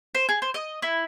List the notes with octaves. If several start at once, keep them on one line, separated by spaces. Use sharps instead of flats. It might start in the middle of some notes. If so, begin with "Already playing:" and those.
C5
G#4
C5
D#5
E4